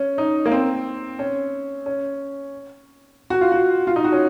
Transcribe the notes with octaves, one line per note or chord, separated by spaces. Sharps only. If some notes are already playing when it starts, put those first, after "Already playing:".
Already playing: C#4
D#4
A#3
C4
C#4
C#4
F#4
F4
F#4
F4
D#4
F#4
C#4